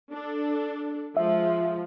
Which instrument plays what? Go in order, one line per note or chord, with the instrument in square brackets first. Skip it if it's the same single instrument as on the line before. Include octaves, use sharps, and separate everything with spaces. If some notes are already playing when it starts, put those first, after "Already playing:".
[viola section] D4 A4
[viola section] F3 G#3 [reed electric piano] E5